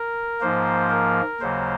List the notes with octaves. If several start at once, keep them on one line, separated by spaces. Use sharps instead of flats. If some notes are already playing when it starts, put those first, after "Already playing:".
Already playing: A#4
G#2 F3 A#3 C5
A#4
D#2 C#3 F#3 A#3 C5